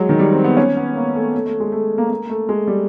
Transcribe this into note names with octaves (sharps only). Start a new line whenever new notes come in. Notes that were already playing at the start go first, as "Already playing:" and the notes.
Already playing: F#3 G#3
D#3
G3
C4
B3
C#4
B3
A#3
A3
A3
A3
G#3
A3
A#3
A#3
A3
G#3
G3